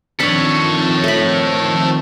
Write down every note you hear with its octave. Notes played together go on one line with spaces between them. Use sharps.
D#3 F3 C4 D4 A4 C#5 B5
A3 B5